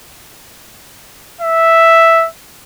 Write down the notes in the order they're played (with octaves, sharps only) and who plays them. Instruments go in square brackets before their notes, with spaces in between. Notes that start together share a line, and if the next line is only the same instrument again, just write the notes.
[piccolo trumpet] E5